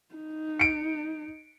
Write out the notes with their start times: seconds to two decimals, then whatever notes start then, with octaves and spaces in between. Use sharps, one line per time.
0.15 D#4
0.59 C#7 D7